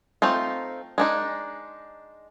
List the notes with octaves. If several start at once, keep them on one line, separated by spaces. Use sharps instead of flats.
A3 C4 D#4 F4
G#3 D4 D#4